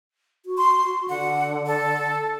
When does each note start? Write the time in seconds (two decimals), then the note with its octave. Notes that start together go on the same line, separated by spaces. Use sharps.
0.46 F#4
0.57 C6
1.09 D3 F#5
1.66 A4